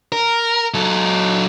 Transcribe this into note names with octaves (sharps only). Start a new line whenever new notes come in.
A#4
F#3 A4